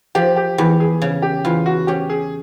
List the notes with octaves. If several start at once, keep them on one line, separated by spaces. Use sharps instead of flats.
F3 G4
G4
E2 G4
G#4
C#3
G4
E2 F4
F#4
C#4 G4
G#4